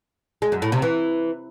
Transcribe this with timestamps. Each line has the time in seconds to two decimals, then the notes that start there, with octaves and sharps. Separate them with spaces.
0.42 G#3
0.52 F#2
0.62 A2
0.72 C3
0.82 E3